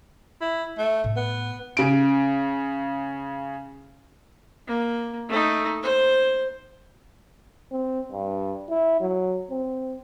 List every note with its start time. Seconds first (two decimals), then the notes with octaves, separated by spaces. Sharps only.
0.41 E4
0.78 A3
1.04 A2 D#4
1.16 B3
1.77 C#3 D7
4.68 A#3
5.29 A3 D#4
5.83 C5
7.71 C4
8.12 G2
8.69 E4
9.01 F#3
9.51 C4